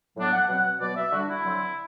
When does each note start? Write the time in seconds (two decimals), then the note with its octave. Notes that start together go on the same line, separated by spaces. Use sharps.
0.17 A2 F#3 B3 D4
0.33 F#5
0.49 B2 F#3 C4 F#5
0.81 B2 F#3 B3 D5
0.96 E5
1.12 D3 G3 D4 F#4
1.28 E4
1.44 D3 F#3 C4